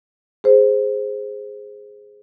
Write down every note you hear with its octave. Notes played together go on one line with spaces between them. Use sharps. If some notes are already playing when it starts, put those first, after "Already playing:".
G#4 C5